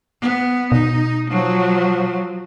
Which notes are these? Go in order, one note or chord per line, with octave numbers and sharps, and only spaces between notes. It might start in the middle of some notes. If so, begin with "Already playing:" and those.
B3
B2 D#4
F3 F#3